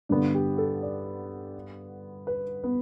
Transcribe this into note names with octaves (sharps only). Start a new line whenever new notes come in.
G2 D3 B3 D4
G4
A4
D5
B4
B3